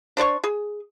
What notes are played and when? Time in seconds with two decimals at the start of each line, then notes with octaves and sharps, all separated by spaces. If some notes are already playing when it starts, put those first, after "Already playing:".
0.17 D4 C5 D5 C#6
0.44 G#4